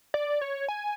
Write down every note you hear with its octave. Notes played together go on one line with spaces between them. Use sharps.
D5
C#5
G#5